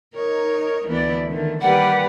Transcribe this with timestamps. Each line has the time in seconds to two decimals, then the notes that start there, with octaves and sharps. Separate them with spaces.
0.15 D#4 A#4 C#5
0.88 D2 E3 B3 E4 D5
1.28 D3 D#3 A3
1.61 D#3 G3 A#3 G4 B4 D5 F#5